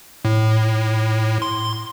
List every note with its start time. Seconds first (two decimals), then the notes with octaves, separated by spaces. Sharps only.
0.25 A2
1.42 C6